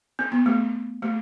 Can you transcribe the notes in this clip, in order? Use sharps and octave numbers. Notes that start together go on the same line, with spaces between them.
C4
B3
A3
A3